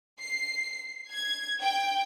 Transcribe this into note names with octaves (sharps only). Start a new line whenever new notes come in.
C7
G#6
G5